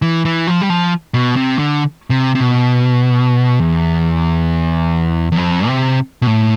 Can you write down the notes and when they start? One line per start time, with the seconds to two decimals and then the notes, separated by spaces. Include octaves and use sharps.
0.02 E3
0.25 E3
0.47 F3
0.61 G3
0.70 F3
1.14 B2
1.36 C3
1.59 D3
2.10 C3
2.35 C3
2.40 B2
3.60 E2
5.32 E2
5.37 F2
5.67 C3
6.22 B2
6.27 A2